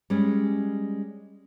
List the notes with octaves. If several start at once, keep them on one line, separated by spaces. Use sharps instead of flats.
G3 G#3 C#4